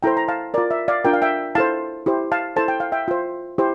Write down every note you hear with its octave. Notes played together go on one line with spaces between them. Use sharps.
E4 A4 C5 G5 A#5
A#5
F5 A5
F4 A#4 D5
E5
D5 F5
D4 F4 A#4 G5
F5
E5 G5
E4 A4 C5 F5 A5
E4 G4 C5
F5 A5
E4 A4 C5 A5
G5
F5
E5 G5
F4 C5
E4 G4 C5